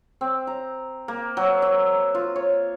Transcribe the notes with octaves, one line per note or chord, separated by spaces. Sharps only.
C4
A#5
A#3
F#3
E5
F4
C#5